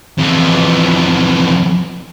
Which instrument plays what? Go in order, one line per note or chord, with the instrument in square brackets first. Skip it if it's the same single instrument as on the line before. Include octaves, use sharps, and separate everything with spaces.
[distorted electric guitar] F2 E3